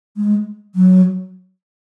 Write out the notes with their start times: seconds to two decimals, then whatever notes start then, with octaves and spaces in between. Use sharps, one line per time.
0.17 G#3
0.75 F#3